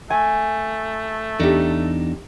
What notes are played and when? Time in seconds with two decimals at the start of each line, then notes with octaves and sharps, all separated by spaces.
0.10 A3 G#5
1.40 E2 D4 D#4 G4 A4